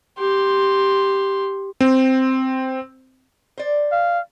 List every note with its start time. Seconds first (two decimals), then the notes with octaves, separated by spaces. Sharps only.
0.18 G4 C6
1.81 C4
3.58 C5 D5
3.92 F5